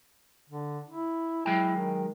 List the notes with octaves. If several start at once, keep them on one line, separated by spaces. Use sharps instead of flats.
D3
E4
F#3 G#3 E4 G5
D#3